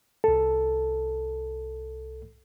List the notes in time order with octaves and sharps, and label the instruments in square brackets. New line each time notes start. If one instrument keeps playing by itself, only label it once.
[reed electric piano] C2 A4